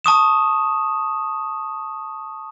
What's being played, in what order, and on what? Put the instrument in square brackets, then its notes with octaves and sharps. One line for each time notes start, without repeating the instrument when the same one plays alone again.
[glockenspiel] A5 C#6 D#6 E7